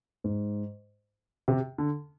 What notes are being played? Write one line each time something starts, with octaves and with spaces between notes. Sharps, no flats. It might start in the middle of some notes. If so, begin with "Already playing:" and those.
G#2
C3
D3